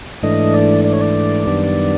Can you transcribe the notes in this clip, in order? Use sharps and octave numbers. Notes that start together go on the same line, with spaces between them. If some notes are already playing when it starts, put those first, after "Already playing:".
G#2 E3 A3 D4 D#5
D5
D5
C#5
D5
F#2 D#3 G3 B3 D4